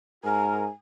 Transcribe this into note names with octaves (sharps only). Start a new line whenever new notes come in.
G#2 F#4 A#4 G#5